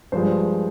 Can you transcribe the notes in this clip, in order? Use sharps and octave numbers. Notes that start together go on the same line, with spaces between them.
G2 F3 G#3 C5